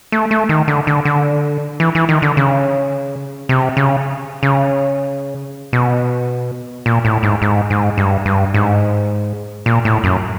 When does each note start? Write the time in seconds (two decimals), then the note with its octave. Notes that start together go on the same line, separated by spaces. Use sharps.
0.12 A3
0.31 A3
0.49 D#3
0.68 D3
0.87 D3
1.05 D3
1.80 E3
1.95 E3
2.09 D#3
2.22 D3
2.37 C#3
3.49 C3
3.77 C#3
4.43 C#3
5.73 B2
6.86 A#2
7.05 A2
7.23 G#2
7.42 G#2
7.70 G#2
7.98 G2
8.25 G2
8.54 G#2
9.66 A#2
9.85 A2
10.04 F#2